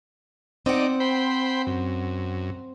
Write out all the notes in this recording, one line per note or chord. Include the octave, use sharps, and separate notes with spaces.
C4 D#4 D5 F#5
C5 G5 B5
F#2